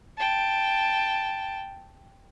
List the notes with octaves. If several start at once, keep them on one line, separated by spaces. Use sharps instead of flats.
G5 A5